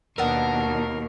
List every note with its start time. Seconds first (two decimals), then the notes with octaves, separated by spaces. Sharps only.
0.18 D#2 B2 B3 D4 A#4 E6